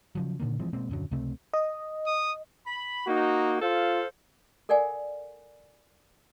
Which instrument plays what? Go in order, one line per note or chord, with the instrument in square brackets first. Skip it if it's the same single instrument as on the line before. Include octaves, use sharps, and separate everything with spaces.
[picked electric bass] C#3 F3 F#3
A#2 D3 D#3 A#3
E3 F3 G#3 C4
B2 G#3 A#3 C4
D#1 F#2 D3 F#3
C#2 C3 A3 C4
[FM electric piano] D#5
[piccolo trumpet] D#6
[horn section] B5
[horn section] A#3 D#4 [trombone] F#4
[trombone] F4 [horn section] A4 C5 F5
[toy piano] A4 A#4 D5 F#5 G#5